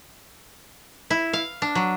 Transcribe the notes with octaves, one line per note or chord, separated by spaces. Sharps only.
E4
F5
D4
F#3